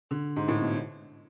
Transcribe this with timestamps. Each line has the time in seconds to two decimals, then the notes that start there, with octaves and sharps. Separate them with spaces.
0.11 D3
0.36 G#2
0.48 A2
0.61 B2